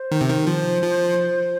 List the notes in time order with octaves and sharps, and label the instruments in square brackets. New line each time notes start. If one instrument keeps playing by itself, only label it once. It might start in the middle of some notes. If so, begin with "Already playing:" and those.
Already playing: [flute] C5
[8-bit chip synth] D#3
C3
D#3
[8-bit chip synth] F3 [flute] C5
[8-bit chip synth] F3